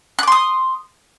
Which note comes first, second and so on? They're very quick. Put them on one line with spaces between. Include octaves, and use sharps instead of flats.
F#6 D6 C6 D#6